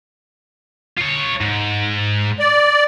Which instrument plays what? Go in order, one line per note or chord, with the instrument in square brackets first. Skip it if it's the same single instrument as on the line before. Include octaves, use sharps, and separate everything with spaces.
[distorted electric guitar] F4 C#5
G#2
[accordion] D5